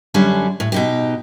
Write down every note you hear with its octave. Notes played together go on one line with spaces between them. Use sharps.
F#2 D3 G3 C#4 D4
A2
B2 D#4 G4